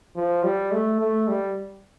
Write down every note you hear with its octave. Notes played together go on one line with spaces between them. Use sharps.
F3
G3
A3
A3
G3